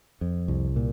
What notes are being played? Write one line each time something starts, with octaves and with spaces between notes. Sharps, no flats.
F2
C2
A#2